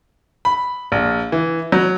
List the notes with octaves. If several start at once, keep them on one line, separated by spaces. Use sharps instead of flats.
B5
A#1
E3
F#3